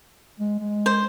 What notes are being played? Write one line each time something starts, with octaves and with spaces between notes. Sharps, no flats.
G#3
G#3
C5